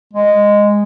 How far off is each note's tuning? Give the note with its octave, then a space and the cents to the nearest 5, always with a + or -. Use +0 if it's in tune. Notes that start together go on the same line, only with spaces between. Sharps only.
G#3 -10